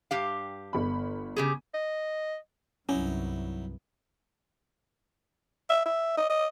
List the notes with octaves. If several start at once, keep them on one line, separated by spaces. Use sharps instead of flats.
G2 G4 F5
G1 B5
C#3 G4 G#4
D#5
C2 G2 F#3 C#4 D#4 E4
E5
E5
D#5
D#5